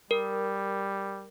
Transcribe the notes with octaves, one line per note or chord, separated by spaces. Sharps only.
G3 A#4